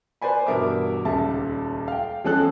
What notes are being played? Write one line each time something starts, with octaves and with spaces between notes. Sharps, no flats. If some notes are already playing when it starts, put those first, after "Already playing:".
B4 C5 D5 G#5 B5
E2 G2 B2 A#4 E5 D6
D#1 C#2 E5 A5
F5 G5
E2 F3 G#3 C#4 A4 F#6